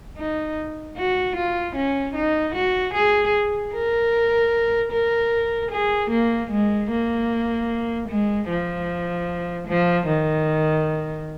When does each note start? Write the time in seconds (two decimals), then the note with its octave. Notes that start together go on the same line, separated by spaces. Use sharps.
0.17 D#4
0.96 F#4
1.36 F4
1.76 C#4
2.15 D#4
2.55 F#4
2.94 G#4
3.74 A#4
4.92 A#4
5.71 G#4
6.11 A#3
6.51 G#3
6.91 A#3
8.09 G#3
8.49 F3
9.68 F3
10.07 D#3